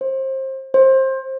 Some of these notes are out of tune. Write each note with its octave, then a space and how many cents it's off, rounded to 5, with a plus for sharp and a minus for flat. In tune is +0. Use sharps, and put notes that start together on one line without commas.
C5 +25
C5 +20